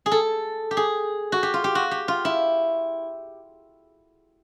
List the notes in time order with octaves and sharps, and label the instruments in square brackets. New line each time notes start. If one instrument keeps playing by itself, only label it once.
[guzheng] G#4
A4
G4
G#4
F#4
G4
F4
G4
F#4
G4
F4
E4